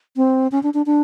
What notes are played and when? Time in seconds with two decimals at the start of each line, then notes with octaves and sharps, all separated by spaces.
0.17 C4
0.52 C#4
0.63 D4
0.74 D4
0.86 D4